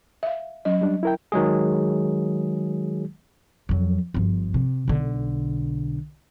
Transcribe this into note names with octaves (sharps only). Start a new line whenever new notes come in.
E5 F5
F#3 C#4 D#5
G3 D4
E4 A#4 G5
D#3 F#3 G#3 G#4
F2 F#3
G1 F3
C3
B1 D3